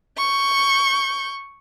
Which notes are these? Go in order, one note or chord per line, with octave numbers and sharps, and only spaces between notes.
C#6 G6